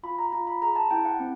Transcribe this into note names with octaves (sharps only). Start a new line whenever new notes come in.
F4 B5
A#5
F4 A#5
B5
G#4 A#5
A5
E4 G5
F#5
C4